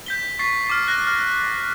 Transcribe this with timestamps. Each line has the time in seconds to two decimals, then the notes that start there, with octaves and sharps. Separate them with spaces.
0.06 G6 B6 G7
0.39 C#6 A6 B6 C7
0.70 D6 F6
0.88 F#6 A#6
1.07 F6